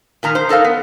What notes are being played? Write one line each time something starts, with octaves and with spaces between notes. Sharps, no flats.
A#2 D#3 A#5
C5
D#4 A4 A#4 F5
B3